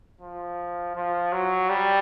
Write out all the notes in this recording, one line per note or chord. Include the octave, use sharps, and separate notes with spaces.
F3
F3
F#3
G3